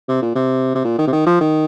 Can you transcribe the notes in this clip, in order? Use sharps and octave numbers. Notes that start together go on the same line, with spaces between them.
C3
A#2
C3
C3
A#2
D#3
C3
D#3
F3
D#3